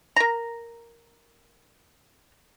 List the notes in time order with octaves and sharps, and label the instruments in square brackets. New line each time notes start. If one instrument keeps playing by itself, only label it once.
[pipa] A#4 A#5